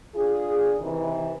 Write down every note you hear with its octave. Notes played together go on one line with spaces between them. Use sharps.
D4 F4 G#4
C3 D#3 E3